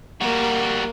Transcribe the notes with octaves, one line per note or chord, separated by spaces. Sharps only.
G3 A#3 F#4